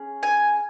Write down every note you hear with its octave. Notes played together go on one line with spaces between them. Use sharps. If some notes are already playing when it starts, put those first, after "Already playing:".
Already playing: C#4 G#4
G#5